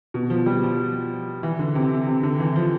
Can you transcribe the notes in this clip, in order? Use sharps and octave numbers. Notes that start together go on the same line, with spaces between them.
B2
F3
G3
F3
E3
D3
C3
C3
D3
E3
F3